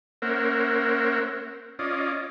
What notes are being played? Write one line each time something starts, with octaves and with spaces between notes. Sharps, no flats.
A#3 C#4 A#4 C5 E5 F#5
C#4 F4 D5 D#5